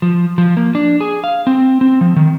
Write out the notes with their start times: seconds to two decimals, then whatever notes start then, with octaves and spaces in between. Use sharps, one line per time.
0.02 F3
0.38 F3
0.57 A#3
0.75 D4
1.01 G#4
1.24 F5
1.47 C4
1.81 C4
2.01 F3
2.16 D#3